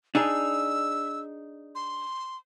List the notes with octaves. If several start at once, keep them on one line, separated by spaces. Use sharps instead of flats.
D4 D#4 G#4 E6
C6